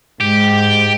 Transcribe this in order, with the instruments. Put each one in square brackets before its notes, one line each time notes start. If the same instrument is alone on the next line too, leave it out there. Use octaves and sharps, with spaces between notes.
[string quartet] G#2 [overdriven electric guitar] G4